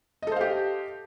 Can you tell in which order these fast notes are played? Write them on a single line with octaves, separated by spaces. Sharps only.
D#5 A4 C5 F5 G4